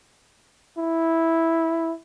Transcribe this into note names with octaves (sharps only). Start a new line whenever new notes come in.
E4